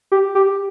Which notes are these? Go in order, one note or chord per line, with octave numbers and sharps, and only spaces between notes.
G4
G4